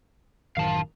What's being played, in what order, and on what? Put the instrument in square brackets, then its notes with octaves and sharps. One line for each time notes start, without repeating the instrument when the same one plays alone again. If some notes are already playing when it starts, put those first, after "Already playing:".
[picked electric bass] A1 F#2 D#3 [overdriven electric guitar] F5 A5